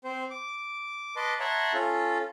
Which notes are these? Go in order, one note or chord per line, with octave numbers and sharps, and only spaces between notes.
C4 C5
D6
B4 D#5 A5 C6 D6
C#5 E5 F#5 A5 A#5 C6
C#4 F4 A4